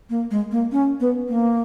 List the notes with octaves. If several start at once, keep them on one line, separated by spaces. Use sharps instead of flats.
A#3
G#3
A#3
C#4
B3
A#3